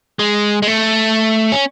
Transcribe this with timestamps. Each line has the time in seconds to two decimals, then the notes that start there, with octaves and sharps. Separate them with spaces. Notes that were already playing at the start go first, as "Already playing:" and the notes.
0.19 G#3
0.63 G#3
0.67 A3
1.52 C#4